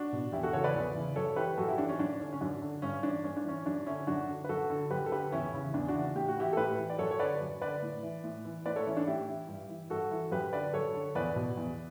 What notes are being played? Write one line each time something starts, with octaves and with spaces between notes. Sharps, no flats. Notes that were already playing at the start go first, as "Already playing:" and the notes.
Already playing: D4 F#4
B2
E2 E4 G4
F#4 A4
C#3 E3 A4 C#5
B4 D5
E2
C#3 E3
F#2 A4 C#5
E3 G4 B4
F#2 F#4 A4
E4 G4
E3 D4
C#4
F#2 D4
D3 C#4
C#4
F#2 D4
D3
G2 C#4
E3 D4
G2 C#4
D4
E3 C#4
F#2 D4
D3 C#4 E4
F#2 D4 F#4
D3
B4
F#2 F#4 A4
D3
F#2 G4 B4
A4
D3 G4 B4
E2 C#4 E4
C#3 E3
E2 D4
D4 F#4
C#3 E3
A2 G4
F#4
E3 E4 G4
A4
A2 G4 B4
E3
D5
F#2 A4 C#5
C#5
D3 B4 D5
F#2
D3 B4 D5
A2
E3
A2
E3
A2 B4 D5
A4 C#5
E3 C#4 E4
D4
A2 E4 G4
E3
G2
E3
G2 F#4 A4
E3
F#2 G4 B4
D3 B4 D5
F#2 A4 C#5
D3
E2 B4 D5
B2
E2